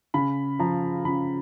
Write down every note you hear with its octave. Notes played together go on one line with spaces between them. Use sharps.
C#3 B5
F3 A#5
C#3 B5